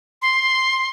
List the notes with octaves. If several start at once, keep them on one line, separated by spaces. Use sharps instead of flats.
C6